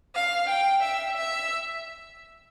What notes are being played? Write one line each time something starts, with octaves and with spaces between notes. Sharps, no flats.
F5
G5
E5
E5